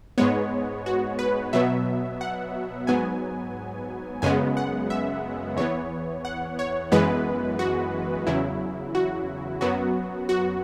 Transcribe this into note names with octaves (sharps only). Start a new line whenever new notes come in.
G#2 G#3 B3 C#5
F#4
B4
B2 F#3 B3 E5
F#5
G#2 F#3 B3 G#5
F#2 C#3 G#3 B3 G#5
F#5
E5
E2 E3 B3 C#5
F#5
C#5
F#2 E3 G#3 B3 B4
F#4
E2 C#3 F#3 E4
F#4
F#2 F#3 B3 F#4
F#4